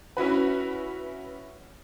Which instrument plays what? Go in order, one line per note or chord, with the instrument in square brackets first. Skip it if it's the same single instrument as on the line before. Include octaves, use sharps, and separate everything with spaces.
[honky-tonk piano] C#4 E4 F#4 B4